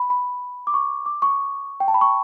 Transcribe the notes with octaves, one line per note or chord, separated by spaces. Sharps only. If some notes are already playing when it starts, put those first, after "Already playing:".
Already playing: B5
B5
D6
C#6
D6
C#6
G5
A5
B5
C#6